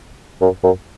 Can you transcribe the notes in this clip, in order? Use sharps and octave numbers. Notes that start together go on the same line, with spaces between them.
F#2
F#2